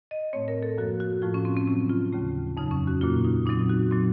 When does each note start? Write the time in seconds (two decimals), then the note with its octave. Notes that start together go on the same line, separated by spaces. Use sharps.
0.11 D#5
0.33 A2 A3 C4 C#5
0.48 A#4
0.63 A4
0.78 F#2 F3 A#3 F#4
1.00 F#4
1.22 A2 F3 A3 F4
1.34 C#4
1.45 C4
1.57 C4
1.67 C3 D#3 F#3 A3 C4 C#4
1.90 F4
2.12 D#2 C#3 A3
2.57 F2 C#3 F#3 D#4
2.71 C#4
2.87 F#4
3.01 A#2 F#3 A#3 F4
3.25 D#4
3.46 A#2 F#3 C4 D#4
3.69 F#4
3.91 A#2 F#3 C4